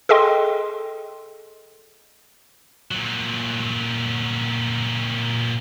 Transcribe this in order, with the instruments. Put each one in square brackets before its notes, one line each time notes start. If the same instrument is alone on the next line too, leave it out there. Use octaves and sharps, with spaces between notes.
[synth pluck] G#4 A4 D#5 G5 C6
[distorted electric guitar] A#2 F#3